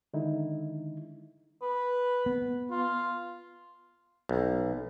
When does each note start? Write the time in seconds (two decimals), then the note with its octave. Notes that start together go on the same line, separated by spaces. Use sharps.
0.14 D3 D#3 G#3 D#4 E4
1.62 B4
2.26 B3
2.71 F4
4.29 B1